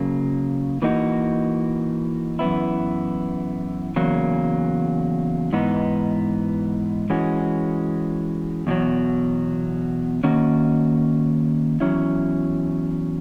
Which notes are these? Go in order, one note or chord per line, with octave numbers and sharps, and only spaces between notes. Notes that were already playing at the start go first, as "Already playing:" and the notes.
Already playing: C#3 F#3 A#3
E3 A#3 D#4 F#4
F#2 E3 B3 E4
E2 C#3 F#3 A#3
G#2 E3 B3 D#4
E3 G#3 C#4 F#4
E2 B2 F#3
D#3 A#3 C#4 F#4
E2 C#3 F#3 C#4 E4